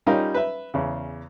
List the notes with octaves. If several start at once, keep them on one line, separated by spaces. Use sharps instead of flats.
G3 C#4 D#4 F4 A#4
B4 E5
E2 C#3